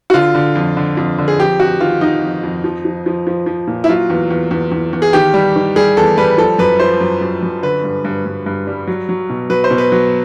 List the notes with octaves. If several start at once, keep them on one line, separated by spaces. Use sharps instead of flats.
F#4
D3 F4
D3
F2
D3
F2
D3
G#4
F2 G4
F2 F#4
D#3 F4
D#3 D#4
F2
F2
F3
F3
F3
F3
F3
A#2
E4
F#3 F4
E2
E2
E2
E2
E2
G#4
D#3 G4
G3
D#3
G3 G#4
E2 A4
G3 B4
F3 A4
F#2 B4
F3 C5
F#2
F#2
F#2
D3 B4
G2
G2
G2
G2
G3
F#3
F#3
B2
F#3 B4
C5
B2
B4
F#3